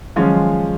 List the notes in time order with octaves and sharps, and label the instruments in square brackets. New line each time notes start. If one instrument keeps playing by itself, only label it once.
[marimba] D#3 F#3 [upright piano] F3 G#3 C#4 F4